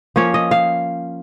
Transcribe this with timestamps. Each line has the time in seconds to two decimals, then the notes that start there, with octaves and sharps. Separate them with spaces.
0.16 F3 A#3 C#4 C#5
0.34 D#5
0.51 F5